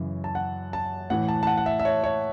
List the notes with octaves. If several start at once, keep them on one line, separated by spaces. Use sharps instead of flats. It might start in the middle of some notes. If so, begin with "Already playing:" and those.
Already playing: F#2 C#3 E3
A5
F#5
A5
A2 E3 F#5
A5
A5
F#5
F#5
E5
E5
C#5
C#5